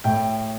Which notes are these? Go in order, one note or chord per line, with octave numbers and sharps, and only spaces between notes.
A2 G5